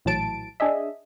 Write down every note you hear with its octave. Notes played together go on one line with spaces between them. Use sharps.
A#1 A2 E3 F#3 A5 D7
D4 G#4 D#5 E5